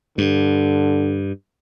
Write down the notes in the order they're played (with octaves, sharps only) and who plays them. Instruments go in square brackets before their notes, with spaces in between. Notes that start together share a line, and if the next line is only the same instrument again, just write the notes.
[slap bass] G2 [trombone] D3